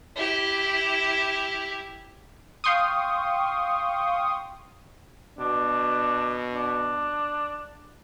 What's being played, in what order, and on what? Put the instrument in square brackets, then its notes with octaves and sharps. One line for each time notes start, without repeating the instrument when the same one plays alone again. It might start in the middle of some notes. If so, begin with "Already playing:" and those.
[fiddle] E4 G4
[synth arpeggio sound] F5 G5 C6 C#6 D#6
[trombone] B2 [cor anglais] D4
[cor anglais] D4